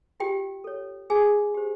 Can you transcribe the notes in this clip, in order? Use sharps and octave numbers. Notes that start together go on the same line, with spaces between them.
F4 G4 G5
A4 C#5
E4 G#4 G#5
G4 C5